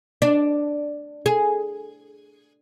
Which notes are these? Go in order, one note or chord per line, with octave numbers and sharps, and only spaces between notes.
D4
G#4